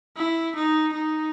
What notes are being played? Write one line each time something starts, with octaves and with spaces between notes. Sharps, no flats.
E4
D#4
D#4